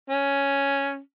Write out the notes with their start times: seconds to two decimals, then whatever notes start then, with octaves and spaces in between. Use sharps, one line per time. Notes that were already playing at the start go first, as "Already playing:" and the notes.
0.10 C#4